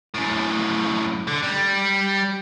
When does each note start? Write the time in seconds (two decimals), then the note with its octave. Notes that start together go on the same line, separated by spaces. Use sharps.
0.14 F#2 A2
1.28 D3
1.43 G3